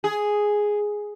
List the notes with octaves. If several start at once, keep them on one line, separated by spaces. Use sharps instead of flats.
G#4